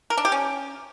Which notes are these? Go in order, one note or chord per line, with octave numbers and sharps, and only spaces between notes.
A#4
D4
G4
C#4